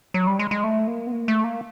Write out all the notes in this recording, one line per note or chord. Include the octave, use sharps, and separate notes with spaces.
F#3
G3
G#3
G#3
A3
A#3
B3
A#3
A3
A#3